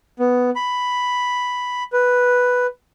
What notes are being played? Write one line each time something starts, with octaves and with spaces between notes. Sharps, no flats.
B3
B5
B4